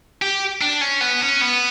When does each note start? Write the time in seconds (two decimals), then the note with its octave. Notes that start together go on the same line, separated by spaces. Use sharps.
0.22 G4
0.61 D4
0.81 C#4
1.01 B3
1.21 C#4
1.41 B3